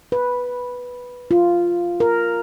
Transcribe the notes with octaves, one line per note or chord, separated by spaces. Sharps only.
B4
F4
A#4